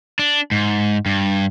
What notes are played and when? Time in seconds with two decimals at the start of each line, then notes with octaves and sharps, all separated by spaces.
0.19 D4
0.51 G#2
1.06 G2